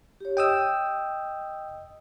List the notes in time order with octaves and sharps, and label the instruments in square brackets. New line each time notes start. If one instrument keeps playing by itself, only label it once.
[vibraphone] G4 C#5
[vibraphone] D#5 [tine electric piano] G5 D#6 E6